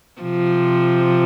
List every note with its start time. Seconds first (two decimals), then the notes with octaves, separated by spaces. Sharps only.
0.21 C3 F3